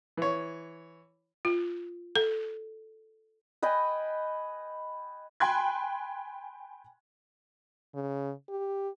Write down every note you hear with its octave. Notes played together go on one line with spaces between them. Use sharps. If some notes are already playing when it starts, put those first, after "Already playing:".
E3 C#5
F4
A4
B4 D#5 G5 G#5
G5 G#5 B5 C6 F#6 G#6
C#3
G4